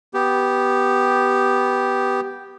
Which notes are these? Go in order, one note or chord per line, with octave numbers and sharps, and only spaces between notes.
B3 G4